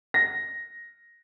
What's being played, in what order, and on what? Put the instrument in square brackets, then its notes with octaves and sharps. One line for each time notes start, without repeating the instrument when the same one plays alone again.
[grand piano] A#6